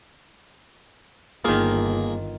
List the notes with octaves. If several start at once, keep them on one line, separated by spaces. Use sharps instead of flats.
G1 D#3 A#3 F4 G#4